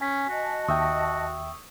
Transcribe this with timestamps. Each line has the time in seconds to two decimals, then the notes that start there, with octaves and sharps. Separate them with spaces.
0.01 C#4 G#5 B6
0.29 F#4 D#5 A5
0.68 D#2 E5 G5 C#6 D#6 E6